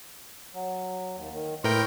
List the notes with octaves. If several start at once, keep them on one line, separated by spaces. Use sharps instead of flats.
F#3
D#2
D#3
A2 A#4 B4 G5 C6 C#6